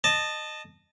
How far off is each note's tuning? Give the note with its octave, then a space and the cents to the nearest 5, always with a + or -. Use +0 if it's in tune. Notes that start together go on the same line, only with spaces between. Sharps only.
D#5 -20 A5 +0